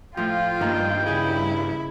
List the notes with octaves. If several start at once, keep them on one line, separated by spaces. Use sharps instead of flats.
A2 F3 F4 G5
G2 D#3 A#3
C#3 E4 G#4